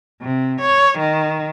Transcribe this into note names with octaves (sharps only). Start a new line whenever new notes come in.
C3
C#5
D#3